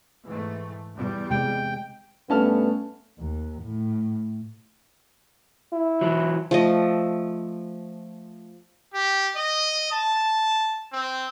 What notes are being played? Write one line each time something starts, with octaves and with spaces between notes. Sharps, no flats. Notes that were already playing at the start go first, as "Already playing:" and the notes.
G#2 E3 A3
E2 G3
C3 G#3 G5
G2 A3 B3 C#4 A5 F6
D#2
A2
E4
E3 F#3
F3 A3 D#5
G4
D#5
A5
C4